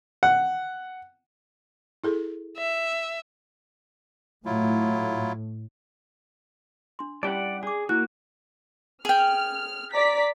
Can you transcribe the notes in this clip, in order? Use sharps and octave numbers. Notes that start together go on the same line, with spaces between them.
F#5
E4 G#4 A4
E5
A2 F#3 E4 F4
D4 C6
G3 C#4 E4 G4 D5 F#5 A5
G#4 D5 D6
A#3 E4 F#4 F#6
G#4 G5 F6
D5 A#5 B6